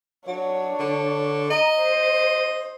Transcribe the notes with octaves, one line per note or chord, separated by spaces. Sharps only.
F#3 D4 C#5
D3
D#5 A#5
C5